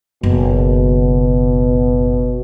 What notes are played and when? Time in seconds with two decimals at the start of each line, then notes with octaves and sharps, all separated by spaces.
0.23 F#1 B2